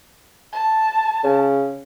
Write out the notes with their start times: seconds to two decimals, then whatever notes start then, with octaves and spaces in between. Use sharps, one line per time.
0.53 A5
1.24 C#3